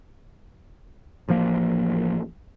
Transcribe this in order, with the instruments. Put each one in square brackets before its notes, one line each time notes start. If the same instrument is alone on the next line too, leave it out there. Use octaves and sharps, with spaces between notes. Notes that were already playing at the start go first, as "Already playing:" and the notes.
[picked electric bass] A1 F3 A#3